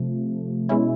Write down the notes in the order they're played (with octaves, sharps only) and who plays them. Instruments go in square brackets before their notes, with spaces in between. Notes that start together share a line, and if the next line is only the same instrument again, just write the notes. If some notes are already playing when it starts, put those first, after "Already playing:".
Already playing: [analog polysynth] C3 F3 A3
B2 G#3 C#4 E4